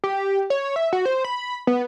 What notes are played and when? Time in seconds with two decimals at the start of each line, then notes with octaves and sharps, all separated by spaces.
0.04 G4
0.50 C#5
0.76 E5
0.93 F#4
1.06 C5
1.25 B5
1.67 B3